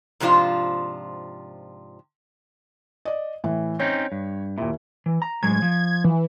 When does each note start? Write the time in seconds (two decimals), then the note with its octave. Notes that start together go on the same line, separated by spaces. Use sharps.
0.20 G#2 C3 F3 D4 F4
3.05 D5 D#5
3.44 A2 E3
3.80 C4 C#4 D#4 C#5
4.12 G2
4.58 D#2 A#2 E4
5.06 E3
5.22 A#5
5.43 A2 F#3 G#3 G#6
5.62 F3
6.04 E3